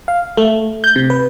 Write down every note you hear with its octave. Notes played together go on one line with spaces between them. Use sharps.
F5
A3
G6
C3
B4